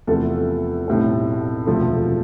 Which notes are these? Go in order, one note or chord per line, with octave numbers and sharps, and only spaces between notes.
E2 C3 F3 A3 A4
B1 A2 G3 C4
E1 D2 C3 F3 A3